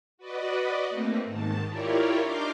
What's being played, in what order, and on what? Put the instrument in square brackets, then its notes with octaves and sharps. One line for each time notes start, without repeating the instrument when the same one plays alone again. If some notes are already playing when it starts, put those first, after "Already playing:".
[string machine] F#4 B4 D5 D#5
A3 A#3 C4 D#4
G#2 D#3 A5
E4 F4 G4 A#4 C#5 D5
D4 D#4 C6 D6 F6 G6